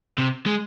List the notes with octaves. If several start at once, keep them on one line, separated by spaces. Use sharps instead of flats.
C3
G#3